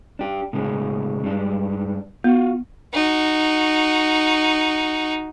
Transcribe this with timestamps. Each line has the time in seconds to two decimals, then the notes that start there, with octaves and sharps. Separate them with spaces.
0.19 D4 G4
0.53 A2 C#3 G#3
1.24 G2 G#3 D4
2.24 B3 F4 F#4
2.93 D#4 F#4